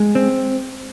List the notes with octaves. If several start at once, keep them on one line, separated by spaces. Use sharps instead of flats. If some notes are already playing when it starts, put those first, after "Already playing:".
Already playing: G#3
C4